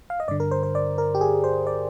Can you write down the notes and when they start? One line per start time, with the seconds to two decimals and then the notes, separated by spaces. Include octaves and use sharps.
0.10 F5
0.20 D#5
0.28 G2 D3 D5
0.40 A#4
0.51 C5
0.63 C5
0.75 D5
0.98 A#4
1.15 G4
1.21 G#4
1.44 C5
1.67 D5